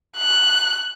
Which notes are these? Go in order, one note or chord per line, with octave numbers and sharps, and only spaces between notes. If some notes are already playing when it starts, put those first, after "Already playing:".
F#6